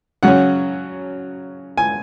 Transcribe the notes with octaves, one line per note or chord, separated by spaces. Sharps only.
C#3 F#3 C#4 F#5
G#5